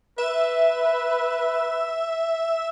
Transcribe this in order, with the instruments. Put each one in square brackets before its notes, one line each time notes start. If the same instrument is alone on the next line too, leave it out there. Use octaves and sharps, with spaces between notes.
[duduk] B4 [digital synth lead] E5